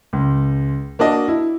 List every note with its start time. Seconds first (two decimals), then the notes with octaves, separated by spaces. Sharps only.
0.13 C#2
0.99 A#3 D4 F#4 D#5
1.28 E4